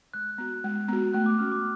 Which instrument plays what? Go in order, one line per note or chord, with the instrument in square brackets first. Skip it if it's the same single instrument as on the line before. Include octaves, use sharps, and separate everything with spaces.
[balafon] G#3 [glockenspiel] F#6
[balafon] B3 F#4
G#3
B3 F#4
[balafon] A3 [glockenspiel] F#6
[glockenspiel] D6
[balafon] C#4 F#4 [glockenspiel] F6
[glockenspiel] D6